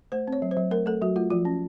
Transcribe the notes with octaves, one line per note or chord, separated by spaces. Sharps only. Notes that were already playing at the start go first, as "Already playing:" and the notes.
A3 C5
C4
C#5
F#3
C5
F#3
A3 A#4
A3 A4
F#3 F#4
A3 F4
F3 F4
C#4